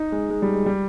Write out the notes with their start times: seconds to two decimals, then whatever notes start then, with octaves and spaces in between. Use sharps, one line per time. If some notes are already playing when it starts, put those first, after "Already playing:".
Already playing: D#4
0.12 G#3
0.30 G#3
0.42 G3
0.54 G#3
0.66 G3